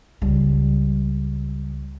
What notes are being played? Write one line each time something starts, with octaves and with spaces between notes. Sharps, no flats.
C#2 G3